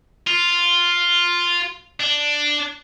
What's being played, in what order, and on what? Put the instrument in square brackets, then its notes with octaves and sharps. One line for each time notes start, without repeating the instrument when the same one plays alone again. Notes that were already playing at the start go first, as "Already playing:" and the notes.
[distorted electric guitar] F4
D4